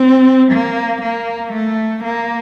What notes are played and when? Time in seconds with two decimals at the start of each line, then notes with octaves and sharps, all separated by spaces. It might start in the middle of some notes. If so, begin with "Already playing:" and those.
Already playing: C4
0.52 A#3
1.02 A#3
1.52 A3
2.03 A#3